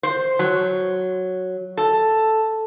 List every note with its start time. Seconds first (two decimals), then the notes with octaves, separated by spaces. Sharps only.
0.03 C5
0.39 F#3
1.77 A4